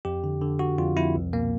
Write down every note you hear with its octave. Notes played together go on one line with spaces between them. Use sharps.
F2 G4
D3
D3
D3 F#4
F2 F4
F2 E4
C2
B2 A#3